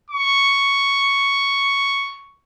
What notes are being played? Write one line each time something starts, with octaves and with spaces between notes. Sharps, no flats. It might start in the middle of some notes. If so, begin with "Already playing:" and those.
C#6